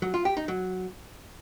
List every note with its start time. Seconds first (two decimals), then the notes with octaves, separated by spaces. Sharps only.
0.02 F#3
0.14 F4
0.25 G4
0.37 D#4
0.48 F#3